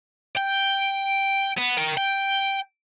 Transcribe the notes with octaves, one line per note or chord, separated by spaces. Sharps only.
G5
B3
A#4 G5
G5